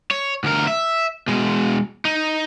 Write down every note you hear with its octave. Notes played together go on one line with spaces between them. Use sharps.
C#5
D2 A#4
E5
B2 G#3
D#4